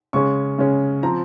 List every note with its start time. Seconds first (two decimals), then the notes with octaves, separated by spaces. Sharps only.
0.13 C#3 G#3 C#4 C#6
0.58 C#3 G#3 C#4
1.03 F3 C4 A#5